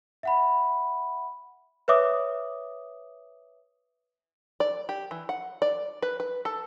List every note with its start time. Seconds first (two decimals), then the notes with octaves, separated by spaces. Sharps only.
0.23 E5 F#5 B5
1.88 B4 C#5 E5 D6 D#6
4.60 D5
4.89 G4
5.11 E3
5.29 F#5
5.62 D5
6.02 B4
6.20 B4
6.45 A4